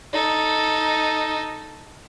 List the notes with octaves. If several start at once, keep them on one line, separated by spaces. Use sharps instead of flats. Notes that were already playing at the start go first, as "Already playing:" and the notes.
D#4 A4